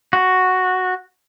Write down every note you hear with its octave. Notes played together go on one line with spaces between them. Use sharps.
F#4